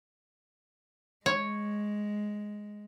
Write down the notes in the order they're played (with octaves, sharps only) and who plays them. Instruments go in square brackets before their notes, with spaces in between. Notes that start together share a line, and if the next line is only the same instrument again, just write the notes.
[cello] G#3 [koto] C#5